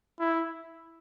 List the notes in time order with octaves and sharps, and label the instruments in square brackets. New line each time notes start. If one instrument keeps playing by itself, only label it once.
[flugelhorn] E4